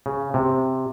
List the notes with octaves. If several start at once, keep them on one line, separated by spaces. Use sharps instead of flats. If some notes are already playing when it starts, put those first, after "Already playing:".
C#3
C3